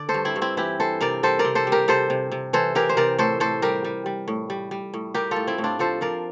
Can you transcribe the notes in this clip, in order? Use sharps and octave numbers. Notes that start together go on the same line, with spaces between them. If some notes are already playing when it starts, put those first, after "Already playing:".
Already playing: D3 D5
A4 C5
G2
C4 E4
G2
C4 E4
E3 E4 G4
E3 A4 C5
C3 A#4 D5
G3 A4 C5
A#4 D5
C3
A4 C5
G3
G4 A#4
C3 A4 C5
C3
C3
E3 A4 C5
E3 G4 A#4
C5
C3 A#4 D5
A2 A4 C5
A2 A4 C5
G3 G4 A#4
G3
G3
A2
G3
G3
A2
G3 G4 A#4
F4 A4
A2
C4 E4
A2
D4 F4
F3 A4 C5
F3 A#4 D5